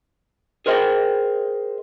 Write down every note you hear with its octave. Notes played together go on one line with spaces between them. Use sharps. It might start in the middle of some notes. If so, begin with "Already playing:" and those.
G#4 A#4 C5 D#5 E5 G5